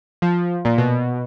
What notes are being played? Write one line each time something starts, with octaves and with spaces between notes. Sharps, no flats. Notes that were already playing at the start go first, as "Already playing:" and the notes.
F3
A#2
B2